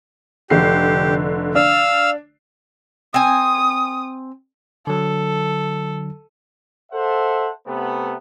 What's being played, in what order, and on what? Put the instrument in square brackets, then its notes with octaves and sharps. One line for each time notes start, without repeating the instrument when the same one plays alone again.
[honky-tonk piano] F1 D3 C7 [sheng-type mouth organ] G4
[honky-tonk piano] D4 [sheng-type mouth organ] F5 E6 F6
[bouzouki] C4 G#5 [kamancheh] D#6
[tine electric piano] D3 F#3 [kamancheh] A4
[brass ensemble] A4 C5 E5 F#5
C3 A3 B3